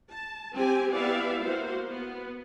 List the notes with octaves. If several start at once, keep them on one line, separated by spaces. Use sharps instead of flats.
A5
C4 G4 G#5
B3 E4 G4 D5 E5 F5
A#3 F#4 C5 F5
B3